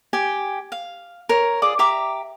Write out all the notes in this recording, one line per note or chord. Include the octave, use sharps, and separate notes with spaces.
G4 G5 G#5
F5
A#4 C#5
F4 G#4 D5
G4 E5 A#5 D6